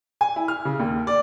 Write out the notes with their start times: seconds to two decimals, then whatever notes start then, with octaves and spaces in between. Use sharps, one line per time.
0.21 G#5
0.36 E4
0.48 F6
0.65 C#3
0.80 D#2
1.07 D5